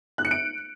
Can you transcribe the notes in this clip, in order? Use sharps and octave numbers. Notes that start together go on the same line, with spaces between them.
F#6
C#7
D7